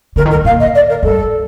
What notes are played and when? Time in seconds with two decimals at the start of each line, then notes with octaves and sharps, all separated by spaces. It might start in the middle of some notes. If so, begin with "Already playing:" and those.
0.16 D3 A#4
0.25 D#3
0.30 A#4
0.35 D3
0.44 A#2 F5
0.60 D#5
0.75 D5
0.89 A#4
1.03 G2 A4